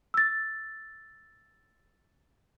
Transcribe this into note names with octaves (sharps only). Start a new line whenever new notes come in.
E6 A6